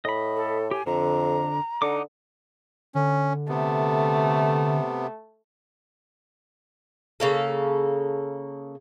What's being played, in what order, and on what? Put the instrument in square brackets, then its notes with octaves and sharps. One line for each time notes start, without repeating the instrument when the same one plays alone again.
[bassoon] A2 [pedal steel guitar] D#5 B5
[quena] A4
[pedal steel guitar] G4 [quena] G#5
[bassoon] F2 [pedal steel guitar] D3 [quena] A#5
[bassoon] D3 [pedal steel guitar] D#4 F#5 D6
[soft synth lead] D3 [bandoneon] C#4
[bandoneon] C3 B3 [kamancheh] A3
[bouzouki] C#3 A#3 A4